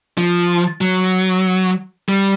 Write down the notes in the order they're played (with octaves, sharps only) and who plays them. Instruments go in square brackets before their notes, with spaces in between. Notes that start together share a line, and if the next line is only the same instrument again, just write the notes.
[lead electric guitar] F3
F#3
G3